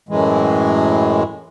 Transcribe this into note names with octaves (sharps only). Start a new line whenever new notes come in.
F#2 A2 E3 G#3